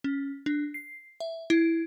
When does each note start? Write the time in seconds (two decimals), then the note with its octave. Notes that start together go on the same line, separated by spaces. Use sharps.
0.04 C#4
0.46 D4
0.74 C7
1.20 E5
1.50 E4